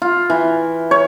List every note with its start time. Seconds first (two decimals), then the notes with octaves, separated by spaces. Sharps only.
0.02 F4
0.30 E3
0.91 C#5